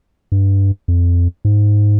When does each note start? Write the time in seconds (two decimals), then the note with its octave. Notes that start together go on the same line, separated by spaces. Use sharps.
0.32 G2
0.88 F2
1.45 G#2